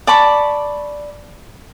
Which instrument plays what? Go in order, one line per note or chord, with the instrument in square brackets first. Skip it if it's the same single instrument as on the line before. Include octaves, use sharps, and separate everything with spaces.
[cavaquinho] D5 A5 B5 C#6